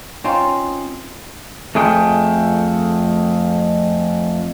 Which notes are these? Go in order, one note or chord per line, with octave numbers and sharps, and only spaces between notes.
C4 C#4 D#4 F4
F2 A3 G#4 C5 G5